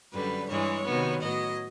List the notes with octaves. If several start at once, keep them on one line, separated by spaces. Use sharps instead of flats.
F#2 D3 G3 B4
G2 E3 G#3 C#5
C3 D#3 F#3 B3
A2 F#3 B3 D#5